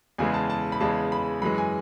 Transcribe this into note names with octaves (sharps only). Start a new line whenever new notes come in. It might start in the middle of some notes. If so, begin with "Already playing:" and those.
E2 C#3 E3 G#3 G#5
A5
A5
B5
E2 C#3 E3 G#3 A5
B5
F#2 E3 G#3 B5
G#5